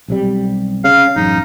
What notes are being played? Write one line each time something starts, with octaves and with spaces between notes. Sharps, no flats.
B1 C3 G3
C#3 F5
A1 F#2 D#4